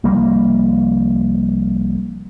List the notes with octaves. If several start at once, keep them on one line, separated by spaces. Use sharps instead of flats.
C2 F3 G3 A#3